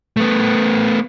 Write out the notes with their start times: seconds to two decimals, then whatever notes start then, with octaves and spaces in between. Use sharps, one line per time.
0.17 A3 B3